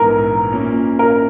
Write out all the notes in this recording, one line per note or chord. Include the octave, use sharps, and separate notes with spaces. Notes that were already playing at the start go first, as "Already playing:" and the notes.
Already playing: A#1 G#2 E3 B3 E4 A#4
A#2 A#3 C#4
A#4